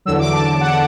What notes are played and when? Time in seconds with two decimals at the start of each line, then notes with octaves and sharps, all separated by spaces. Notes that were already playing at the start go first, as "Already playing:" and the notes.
0.05 E2 D3 F#3 E6
0.19 D6
0.33 A5
0.61 F#5